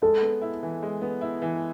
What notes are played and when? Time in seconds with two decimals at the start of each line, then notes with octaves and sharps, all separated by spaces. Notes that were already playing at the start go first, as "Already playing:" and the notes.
0.02 G#3 A4
0.22 B3
0.42 E4
0.63 E3
0.82 G#3
1.02 B3
1.21 E4
1.42 E3